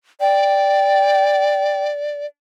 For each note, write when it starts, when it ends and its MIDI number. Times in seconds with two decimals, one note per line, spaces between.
0.20 2.26 74
0.20 1.84 79